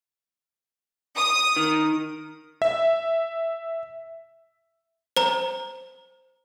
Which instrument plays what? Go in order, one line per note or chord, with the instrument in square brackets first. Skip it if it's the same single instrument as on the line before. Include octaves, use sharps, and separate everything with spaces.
[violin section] D#6
[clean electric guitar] D#3
[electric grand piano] E5
[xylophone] C5 A#5